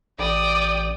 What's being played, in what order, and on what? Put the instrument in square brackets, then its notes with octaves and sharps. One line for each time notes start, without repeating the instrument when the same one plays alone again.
[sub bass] A1 [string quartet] D5 G5 D#6